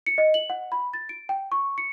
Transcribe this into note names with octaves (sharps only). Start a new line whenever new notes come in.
C#7
D#5
F#7
F#5
B5
A6
D7
G5
C#6
C#7